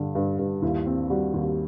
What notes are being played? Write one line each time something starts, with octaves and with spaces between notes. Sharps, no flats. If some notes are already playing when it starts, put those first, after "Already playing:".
Already playing: G2 D3
G2
G2
D#2 E4
C4
G3 F#4
D#2